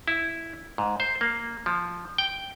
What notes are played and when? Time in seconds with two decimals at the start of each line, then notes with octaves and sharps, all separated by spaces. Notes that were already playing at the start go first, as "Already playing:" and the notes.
0.08 E4
0.78 G#2
1.00 C5
1.21 A#3
1.66 F3
2.18 G5